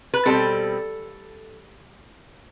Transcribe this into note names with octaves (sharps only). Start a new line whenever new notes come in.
B4
B2 G3 C4 A4